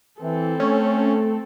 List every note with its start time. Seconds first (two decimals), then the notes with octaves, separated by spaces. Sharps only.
0.22 E3 C4 A4
0.60 A3 C#4